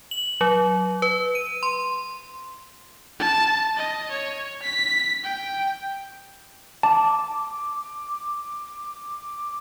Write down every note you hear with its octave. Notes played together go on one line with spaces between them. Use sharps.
F#7
F#3
B4
D#7
C6
A5
D#5
C#5
B6
G5
A5 D6